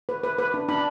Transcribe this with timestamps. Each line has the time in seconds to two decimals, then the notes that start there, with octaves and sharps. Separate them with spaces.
0.09 B4
0.24 B4
0.39 B4
0.54 D4
0.69 D4 B5